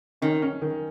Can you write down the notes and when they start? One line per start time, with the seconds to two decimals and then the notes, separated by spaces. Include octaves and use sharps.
0.22 D#3 C#4
0.42 C#4
0.62 D#3